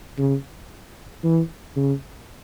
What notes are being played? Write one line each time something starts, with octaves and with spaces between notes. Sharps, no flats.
C#3
E3
C#3